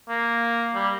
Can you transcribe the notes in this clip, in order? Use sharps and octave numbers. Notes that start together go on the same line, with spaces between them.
A#3
G3